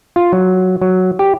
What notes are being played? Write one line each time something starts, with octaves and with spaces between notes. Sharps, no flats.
F4
F#3
F#3
G4